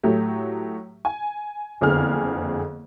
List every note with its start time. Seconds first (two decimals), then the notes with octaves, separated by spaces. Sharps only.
0.03 A2 F#3 A3 G4
1.05 G#5
1.81 F#1 F2 D3 B3 G#4 F6